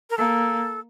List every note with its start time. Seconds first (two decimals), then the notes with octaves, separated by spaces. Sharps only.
0.10 A#4
0.17 A#3 A4